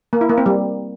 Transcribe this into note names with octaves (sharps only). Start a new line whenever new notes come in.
A#3
E4
A#3
C4
G3